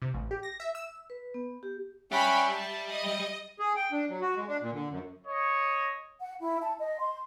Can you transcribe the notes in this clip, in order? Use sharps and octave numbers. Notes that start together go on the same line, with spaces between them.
C3
A1
G4
A#6
E5
E6
B4
B3
G4
G3 C#4 G4 E5 F#5 G5 B5 F6
E5 A5
D#5
G#4
G5
D4
F#3
F#4
G#3
D4
A#2
D3
F#2
C#5 D#5
F#5
E4
A5
D#5
C6